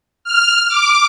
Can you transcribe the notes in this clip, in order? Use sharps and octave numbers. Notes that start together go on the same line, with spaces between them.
F6
D6